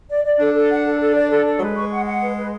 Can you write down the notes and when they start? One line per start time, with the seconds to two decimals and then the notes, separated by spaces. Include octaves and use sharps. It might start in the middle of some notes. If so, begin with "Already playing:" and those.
0.09 D5
0.25 D5
0.39 D4 A4
0.54 A4
0.70 F#5
0.85 A4
1.00 A4
1.15 D5
1.30 A4
1.46 A4
1.56 F#3
1.60 G#3 B4
1.76 C#6
1.91 F#5
2.06 F#5
2.21 B4
2.36 B4